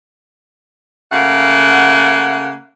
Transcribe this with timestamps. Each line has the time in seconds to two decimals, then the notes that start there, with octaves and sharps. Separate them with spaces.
1.12 C#3 A3 A#3 F#5